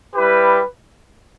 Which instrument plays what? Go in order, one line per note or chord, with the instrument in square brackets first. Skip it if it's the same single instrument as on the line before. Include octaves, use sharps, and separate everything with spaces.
[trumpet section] G3 E4 G4 B4